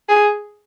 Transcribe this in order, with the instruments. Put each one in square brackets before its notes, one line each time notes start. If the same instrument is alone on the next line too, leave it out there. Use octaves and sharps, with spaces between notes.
[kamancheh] G#4